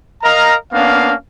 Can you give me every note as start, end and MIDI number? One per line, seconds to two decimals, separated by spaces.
0.23 0.55 70
0.23 0.55 75
0.23 0.55 77
0.23 0.55 82
0.73 1.14 58
0.73 1.14 59
0.73 1.14 61
0.73 1.14 62
0.73 1.14 77